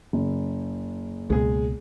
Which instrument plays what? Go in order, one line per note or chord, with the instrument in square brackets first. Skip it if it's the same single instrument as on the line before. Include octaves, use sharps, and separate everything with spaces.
[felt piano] F#1
[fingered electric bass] C#2 B2 [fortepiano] G#3 G#4